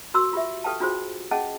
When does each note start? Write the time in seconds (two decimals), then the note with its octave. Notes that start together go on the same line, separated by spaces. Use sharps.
0.14 F#4 A#4 C6 C#6 E6
0.33 F4 G4 E5
0.64 G4 A4 B4 F5 G5 A5
0.80 D4 F4 F#4 G#4 C5
1.31 C#4 G#4 D#5 F#5 A5